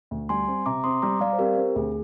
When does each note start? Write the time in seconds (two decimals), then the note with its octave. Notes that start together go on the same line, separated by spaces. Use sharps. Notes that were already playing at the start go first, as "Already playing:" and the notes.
0.11 D2
0.29 G3 G#5 C6
0.48 C4
0.66 C3 A#5 D6
0.84 C4 C6 D#6
1.02 G3 A#5 D6
1.21 G3 D5 F5
1.33 C5
1.39 C4 G4 A#4
1.57 C4
1.76 D2 G#4